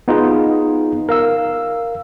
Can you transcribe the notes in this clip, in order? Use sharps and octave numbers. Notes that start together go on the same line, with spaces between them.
B3 D#4 F4 G#4
A#4 F5 E6